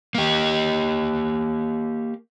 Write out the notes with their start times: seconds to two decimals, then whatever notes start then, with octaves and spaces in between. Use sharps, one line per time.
0.15 A#3 G4